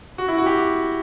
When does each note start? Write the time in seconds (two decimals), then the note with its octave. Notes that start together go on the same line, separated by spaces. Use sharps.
0.18 F#4
0.28 E4
0.38 F#4
0.46 G4